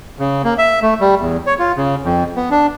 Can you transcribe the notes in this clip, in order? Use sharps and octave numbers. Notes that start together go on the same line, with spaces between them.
C#3
A#3
E5
A3
G3
E2
C#5
F4
C#3
F2
B3
D4